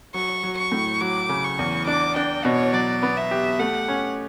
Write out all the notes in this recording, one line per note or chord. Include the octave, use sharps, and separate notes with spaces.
F#3 C#6
F#3
C#6
A2
F#3 D6
C#3
C#6
E2
D4 D6
D4 G5
B2 C#5
F#3 D5
B3
E5
G4
A3 F#5
C#4